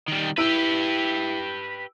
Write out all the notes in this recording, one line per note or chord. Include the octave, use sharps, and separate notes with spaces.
D#3 G3
E4 G4 B4 E6 D7